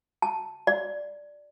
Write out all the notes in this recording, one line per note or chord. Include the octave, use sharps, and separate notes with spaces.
A5
D5